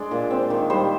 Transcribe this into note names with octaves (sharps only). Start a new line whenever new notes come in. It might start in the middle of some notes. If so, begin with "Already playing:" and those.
Already playing: G#3 D4 D5
A#2
C4
D#3
G3 C5